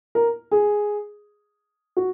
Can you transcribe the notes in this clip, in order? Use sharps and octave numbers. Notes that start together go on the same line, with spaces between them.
A#4
G#4
F#4